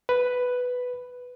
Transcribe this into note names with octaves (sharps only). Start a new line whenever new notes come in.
B4